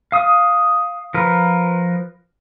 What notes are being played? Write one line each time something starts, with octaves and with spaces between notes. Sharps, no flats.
F5 D#6
F3 A#4 B4